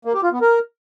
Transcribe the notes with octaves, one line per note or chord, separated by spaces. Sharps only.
A#3
G4
F4
B3
A#4